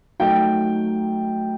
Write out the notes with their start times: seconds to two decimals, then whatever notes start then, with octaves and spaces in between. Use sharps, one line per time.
0.20 F#3 A3 D#4 G5